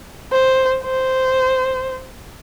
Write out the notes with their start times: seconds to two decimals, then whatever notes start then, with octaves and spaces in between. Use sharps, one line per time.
0.32 C5
0.83 C5